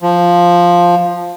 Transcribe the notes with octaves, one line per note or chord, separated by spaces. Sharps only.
F3